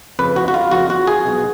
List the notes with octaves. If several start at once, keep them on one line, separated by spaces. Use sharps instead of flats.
F2 C#3 B4
F#4
F#4
F4
F2 C#3 F#4
F#4
G#4
B1 B2